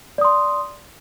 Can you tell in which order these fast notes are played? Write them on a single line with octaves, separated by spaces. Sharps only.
D5 D#6 C6